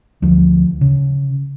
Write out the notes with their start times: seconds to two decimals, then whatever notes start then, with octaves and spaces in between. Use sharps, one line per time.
0.22 D2 F3
0.81 C#3